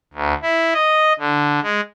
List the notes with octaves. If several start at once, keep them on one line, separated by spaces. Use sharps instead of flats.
D2
E4
D#5
D3
G#3